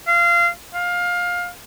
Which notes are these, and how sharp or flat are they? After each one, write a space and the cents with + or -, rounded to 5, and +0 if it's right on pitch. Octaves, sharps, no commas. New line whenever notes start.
F5 -25
F5 +20